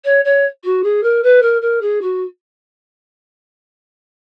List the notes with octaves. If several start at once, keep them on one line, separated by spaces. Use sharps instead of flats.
C#5
C#5
F#4
G#4
A#4
B4
A#4
A#4
G#4
F#4